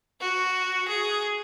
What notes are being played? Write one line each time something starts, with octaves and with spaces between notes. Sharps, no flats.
F#4
G#4